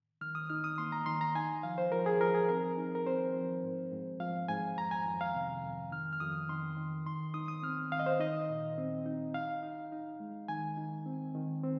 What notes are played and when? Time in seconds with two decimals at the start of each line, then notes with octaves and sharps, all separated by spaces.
0.21 D#3 F6
0.35 D#6
0.50 D#4 F6
0.64 D#6
0.78 A#3 C6
0.92 A#5
1.06 D#3 C6
1.21 A#5
1.35 D#4 G#5
1.63 F3 F5
1.78 C5
1.92 F3 A#4
2.06 G#4
2.21 F3 A#4
2.34 G#4
2.49 C4 A#4
2.77 D#4
2.95 A#4
3.07 C4 C5
3.34 F3
3.63 G#2
3.92 G#2
4.20 F3 F5
4.48 G#2 G#5
4.77 F2 A#5
4.91 G#5
5.06 F2
5.21 F5
5.35 C3
5.63 F2
5.92 D#3 F6
6.13 F6
6.20 F2 D#6
6.49 D#3 C6
6.77 D#3
7.06 D#3 C6
7.34 D#4 D#6
7.48 D#6
7.63 C4 F6
7.92 D#3 F5
7.99 D#5
8.06 C5
8.20 D#4 D#5
8.49 A#2
8.78 C4
9.06 D#4
9.34 D#4 F5
9.63 D#4
9.92 D#4
10.20 G#3
10.48 D#3 G#5
10.77 D#4
11.06 C4
11.35 D#3
11.63 C4